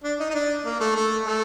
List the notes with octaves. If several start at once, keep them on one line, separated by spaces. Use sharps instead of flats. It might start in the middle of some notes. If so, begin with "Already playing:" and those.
D4
D#4
D#4
D4
A#3
A3
A3
A3